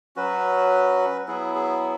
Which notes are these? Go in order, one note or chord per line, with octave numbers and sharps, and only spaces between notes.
F#3 C#4 F#4 B4
F#3 B3 E4 G#4
G#4